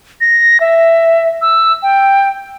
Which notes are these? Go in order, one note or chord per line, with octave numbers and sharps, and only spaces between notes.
A#6
E5
E6
G5